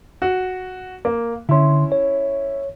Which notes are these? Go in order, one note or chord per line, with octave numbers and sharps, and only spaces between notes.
F#4
A#3
D3 C#4 E4 C6
C#5